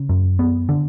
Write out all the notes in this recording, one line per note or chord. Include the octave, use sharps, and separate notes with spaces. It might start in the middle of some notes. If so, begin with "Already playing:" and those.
Already playing: C#3
F#2
B3
D3